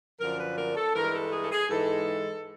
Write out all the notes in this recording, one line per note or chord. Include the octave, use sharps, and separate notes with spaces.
F#2 D3 F3 A#4
B4
A#4
A4
G2 E3 G#3 A#4
A4
G#4
A4
G#4
G#2 E3 G#3 A4